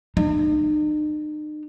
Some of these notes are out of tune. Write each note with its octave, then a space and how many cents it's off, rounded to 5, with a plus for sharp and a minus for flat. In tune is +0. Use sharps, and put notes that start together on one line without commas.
D#4 -45